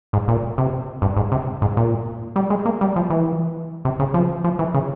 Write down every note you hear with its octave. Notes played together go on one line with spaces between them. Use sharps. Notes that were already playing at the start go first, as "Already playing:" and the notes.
G#2
A#2
C3
G2
G#2
C3
G#2
A#2
G3
G#3
A#3
G3
F3
E3
C3
C#3
F3
F3
E3
C#3